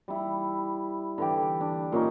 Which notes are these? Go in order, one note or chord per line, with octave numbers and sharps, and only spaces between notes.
G3 E4
D3 E3 G4
D4
A#2 C#4 D#4